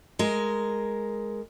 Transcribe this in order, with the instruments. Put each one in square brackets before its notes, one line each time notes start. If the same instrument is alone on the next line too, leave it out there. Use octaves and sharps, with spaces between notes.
[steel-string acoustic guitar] G#3 A#4